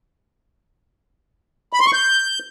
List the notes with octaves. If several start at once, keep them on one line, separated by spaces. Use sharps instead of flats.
B5
C6
C#6
G6